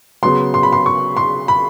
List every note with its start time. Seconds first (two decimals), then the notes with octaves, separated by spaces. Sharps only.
0.23 C#3 F#3 B3 C6
0.54 C6
0.63 B5
0.72 C6
0.86 C#6
1.17 C6
1.48 B5